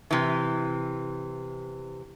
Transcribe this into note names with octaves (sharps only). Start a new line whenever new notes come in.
C3 E3